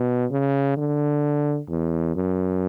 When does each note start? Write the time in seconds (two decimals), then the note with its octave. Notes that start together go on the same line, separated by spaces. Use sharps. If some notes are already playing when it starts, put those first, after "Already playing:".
Already playing: B2
0.31 C#3
0.77 D3
1.69 E2
2.16 F#2